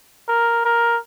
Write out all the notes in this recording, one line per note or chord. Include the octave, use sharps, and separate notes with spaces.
A#4
A#4